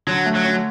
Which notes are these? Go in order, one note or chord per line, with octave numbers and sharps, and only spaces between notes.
D3 F#3
A3
F#3
C#4